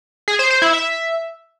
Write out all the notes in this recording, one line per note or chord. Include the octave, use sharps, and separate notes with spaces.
G#4
C5
C5
E4
E5